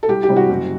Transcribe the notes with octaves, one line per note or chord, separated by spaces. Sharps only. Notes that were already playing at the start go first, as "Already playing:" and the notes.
A4
C2 G4
G4
C3 E3 G3
F#4
F#1